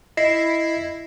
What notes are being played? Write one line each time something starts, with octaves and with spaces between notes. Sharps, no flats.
E4 D#5 A#6 C7